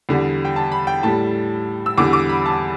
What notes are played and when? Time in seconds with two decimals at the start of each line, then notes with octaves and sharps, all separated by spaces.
0.09 E2 D3 G3
0.45 G5
0.56 A5
0.72 B5
0.87 G5
1.03 A2 G3 A5
1.86 E6
1.98 E2 D3 G3 D6
2.13 D6
2.29 B5
2.46 A5